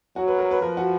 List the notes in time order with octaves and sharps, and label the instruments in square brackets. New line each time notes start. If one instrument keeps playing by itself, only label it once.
[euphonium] F#3 [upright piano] F#4
[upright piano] B4
A#4
B4
[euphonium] F3 [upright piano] A#4
[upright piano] F#4